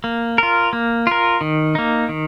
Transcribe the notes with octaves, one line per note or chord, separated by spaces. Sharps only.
A#3
F4 A#4
A#3
F4 A#4
D#3
A#3 D#4
D#3